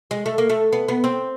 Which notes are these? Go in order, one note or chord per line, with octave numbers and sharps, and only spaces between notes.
G#3
A3
A#3
A3
B3
B3
C4